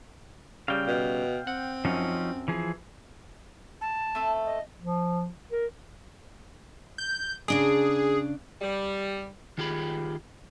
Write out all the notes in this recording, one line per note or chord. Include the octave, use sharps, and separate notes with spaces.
C#3 G3 F5 G5
B2
C4 F#5
F#2 F3 C#4 D#4
E3 F3 G#4
A5
A3 C4 A4
D#5
F3
A#4
G6
C#3 D4 G#4 D5
G3
D#3 F4 G4 G#4 B5